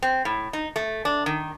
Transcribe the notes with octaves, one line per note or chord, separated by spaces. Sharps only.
C4
A2
D#4
A3
D4
D#3